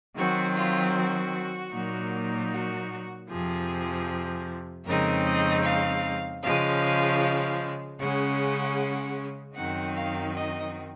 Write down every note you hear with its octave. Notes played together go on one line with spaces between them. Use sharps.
D#3 F#3 C4 F#4
F4
F#4
A#2 F#3 A#3 D#4
F#4
F2 C3 F3 G#4
F2 C#3 G#3 C4 D#4 A#4
D#5
F5
C#3 F3 G#3 F5
C#3 G#3 C#4 F#5
F#2 D#3 F#3 C4 D#4 F#5
F5
D#5